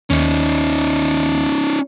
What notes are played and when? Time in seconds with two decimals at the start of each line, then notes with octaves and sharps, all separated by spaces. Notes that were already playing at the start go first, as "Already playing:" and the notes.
0.10 D#2 C#4 D#4